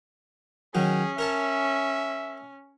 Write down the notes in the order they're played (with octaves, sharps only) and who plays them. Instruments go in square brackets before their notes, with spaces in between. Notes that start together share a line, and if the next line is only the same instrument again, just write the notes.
[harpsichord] D#3 F#3 [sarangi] C#4 [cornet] G#4
[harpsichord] A#4 C#5 A5 [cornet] E5